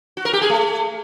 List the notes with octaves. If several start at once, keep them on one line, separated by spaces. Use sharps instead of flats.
F#4
A#4
G4
G#4
A3